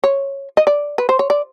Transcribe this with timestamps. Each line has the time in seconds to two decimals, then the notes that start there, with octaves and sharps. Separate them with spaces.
0.04 C#5
0.57 D#5
0.67 D5
0.98 B4
1.09 C5
1.19 C#5
1.30 D5